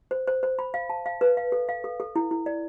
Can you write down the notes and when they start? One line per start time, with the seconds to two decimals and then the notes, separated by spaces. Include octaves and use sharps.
0.11 C5
0.27 C5
0.43 C5
0.59 B5
0.74 F5
0.89 A5
1.06 F5
1.21 B4
1.37 F5
1.52 A4
1.69 F5
1.84 A4
2.00 A4
2.16 E4
2.31 E4
2.46 D5